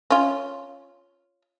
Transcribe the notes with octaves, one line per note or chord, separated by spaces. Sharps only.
C#4 F4